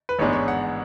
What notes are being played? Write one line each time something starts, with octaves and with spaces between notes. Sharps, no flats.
B4
A1 G#2 G#3 B3 D4 C#5
C#5
F#5